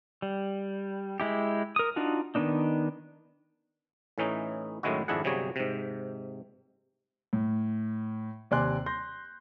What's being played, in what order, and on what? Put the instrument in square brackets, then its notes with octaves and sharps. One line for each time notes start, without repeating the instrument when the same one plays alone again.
[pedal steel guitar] G3
G#3 E4 G4
A#4 D#6
D4 D#4 F4 F#4
D#3 G#3 B3 D4 D#4
[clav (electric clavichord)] A2 E3 C#4 D#4
F#2 A2 D#3 G#3 E4 F#4
G#1 F2 D4 E4 G#4 F#5
G1 C3 F#3 G3 G#4 C#5
G#2 C3
[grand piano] A2
D#2 C3 D5 G#5 C6 F#6
C6 G6 A#6